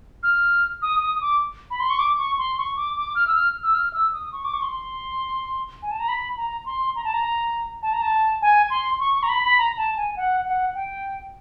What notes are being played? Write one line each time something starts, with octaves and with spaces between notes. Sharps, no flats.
F6
D#6
D#6
D6
B5
C6
C#6
D6
C#6
C6
C#6
D6
D6
F6
E6
F6
E6
F6
E6
D#6
C#6
D6
C#6
C6
G#5
A5
A#5
B5
A#5
C6
A#5
A5
A#5
A5
A#5
A5
G#5
C6
C#6
C#6
A#5
B5
B5
A#5
A5
G#5
F#5
F#5
G5